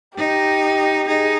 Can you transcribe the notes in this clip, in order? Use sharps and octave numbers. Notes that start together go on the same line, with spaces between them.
D#4 G4
D#4 G#4